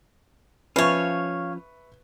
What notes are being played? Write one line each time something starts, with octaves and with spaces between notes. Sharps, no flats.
F3 C#4 B4 C#5 E5 F5 C#6